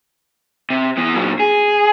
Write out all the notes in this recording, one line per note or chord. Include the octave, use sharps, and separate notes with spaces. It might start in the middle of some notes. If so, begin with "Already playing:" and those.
C3
E3 B3
A#2 F#3
G#4